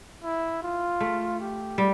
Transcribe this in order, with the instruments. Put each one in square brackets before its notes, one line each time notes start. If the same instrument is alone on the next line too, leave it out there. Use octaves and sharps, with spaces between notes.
[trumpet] E4
F4
[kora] A3
[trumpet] G4
[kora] G3